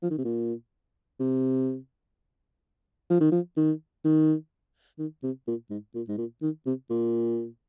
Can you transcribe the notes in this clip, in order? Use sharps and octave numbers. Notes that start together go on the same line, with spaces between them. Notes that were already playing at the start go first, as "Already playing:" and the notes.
F3
D#3
C3
A#2
C3
F3
D#3
F3
D#3
D#3
D#3
C3
A#2
G#2
A#2
G#2
A#2
D#3
C3
A#2